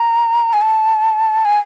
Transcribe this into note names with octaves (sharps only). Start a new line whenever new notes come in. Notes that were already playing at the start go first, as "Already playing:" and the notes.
Already playing: A#5
G#5
A5
G#5